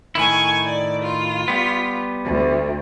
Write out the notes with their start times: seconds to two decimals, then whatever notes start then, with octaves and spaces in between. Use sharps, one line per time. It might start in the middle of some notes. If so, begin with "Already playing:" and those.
0.15 A2 D#3 E4 G#5 C#6
0.64 D5
1.01 F4
1.48 G3 B3
2.25 D2